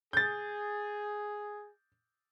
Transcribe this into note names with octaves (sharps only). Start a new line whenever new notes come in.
G#4 G6 A6